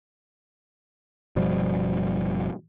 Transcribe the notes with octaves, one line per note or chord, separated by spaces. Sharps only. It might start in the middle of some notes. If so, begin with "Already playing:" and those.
F#1 B2 F3 G3